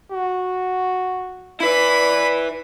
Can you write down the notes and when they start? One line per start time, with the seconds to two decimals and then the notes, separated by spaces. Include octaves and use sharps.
0.12 F#4
1.60 E4 B4 D5 B5